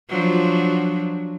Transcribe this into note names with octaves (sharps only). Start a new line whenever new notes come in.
F3 F#3 D4